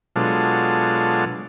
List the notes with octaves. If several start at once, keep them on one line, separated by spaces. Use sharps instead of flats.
B2 F#3 G#3 D4 F4 A4